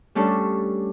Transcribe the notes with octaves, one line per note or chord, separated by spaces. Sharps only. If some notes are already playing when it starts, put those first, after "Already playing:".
G3 A3 C#4 D4 A4